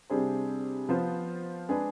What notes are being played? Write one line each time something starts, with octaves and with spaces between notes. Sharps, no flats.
C3 G3 D4 G#4 C5
F3 B3 F4 C5
G#3 D4 G#4 B4